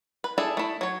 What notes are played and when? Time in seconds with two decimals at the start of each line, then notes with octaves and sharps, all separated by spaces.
0.24 B4
0.38 D4 E4 G#4 A4
0.57 A3 E4
0.81 F#3 C#5